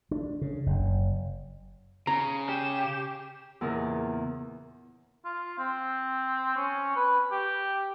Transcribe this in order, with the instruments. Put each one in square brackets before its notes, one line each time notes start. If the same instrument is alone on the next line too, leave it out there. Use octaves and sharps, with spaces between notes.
[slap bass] D4
C#3
F#1
[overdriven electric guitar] C#3 [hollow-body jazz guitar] A#5
[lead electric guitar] G4 [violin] E7
[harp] E2 A#2 C#3 A#4
[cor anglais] F4
C4
C#4
B4
G4